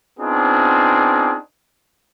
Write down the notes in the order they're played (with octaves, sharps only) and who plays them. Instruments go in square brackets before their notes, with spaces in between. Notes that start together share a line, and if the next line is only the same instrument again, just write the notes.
[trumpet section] B3 C4 D4 D#4 F4 G#4